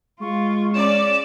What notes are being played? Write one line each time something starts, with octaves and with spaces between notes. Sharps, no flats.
G#3 F4 C#6
C#4 D5 E7